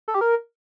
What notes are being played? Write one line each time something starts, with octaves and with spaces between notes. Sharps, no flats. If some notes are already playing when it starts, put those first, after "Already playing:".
A4
G4
A#4